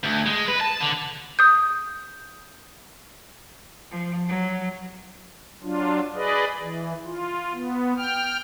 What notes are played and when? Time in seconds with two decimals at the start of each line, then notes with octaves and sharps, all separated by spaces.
0.04 D2
0.26 G#3
0.48 B4
0.61 A5
0.81 D3
1.39 D#6 G6
3.91 F3
4.28 F#3
5.63 F#3 D4 F4
6.16 G#4 B4 D5 D#5
6.60 E3
7.05 F4
7.53 B3
7.97 G5 F6